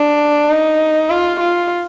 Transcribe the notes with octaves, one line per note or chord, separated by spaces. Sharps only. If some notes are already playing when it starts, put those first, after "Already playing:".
Already playing: D4
D#4
F4
F4